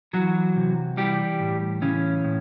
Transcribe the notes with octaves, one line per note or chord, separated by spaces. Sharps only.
E3 F#3 F#4
C3
E3 G3 G4
A2
C#3 E3 C#4
A2